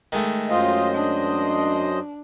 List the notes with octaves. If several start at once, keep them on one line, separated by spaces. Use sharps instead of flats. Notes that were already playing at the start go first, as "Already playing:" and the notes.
D#3 G#3 A3
F#2 F4 C5 D#5
D4